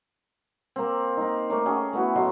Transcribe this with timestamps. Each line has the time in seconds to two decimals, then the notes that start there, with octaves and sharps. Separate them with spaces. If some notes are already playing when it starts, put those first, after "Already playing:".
0.76 A#3 C4
1.17 A#3 D#4
1.50 A3 A#4 C#5 D6
1.66 C#4 G#4 A4 G5
1.93 A3 B3 E4 F#4
2.15 A2 F#3 D#5 C6